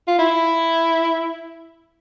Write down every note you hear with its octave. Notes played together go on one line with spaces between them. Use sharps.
F4
E4